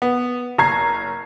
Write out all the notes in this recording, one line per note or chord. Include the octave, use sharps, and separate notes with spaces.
B3
F#1 A#5 G#6 C7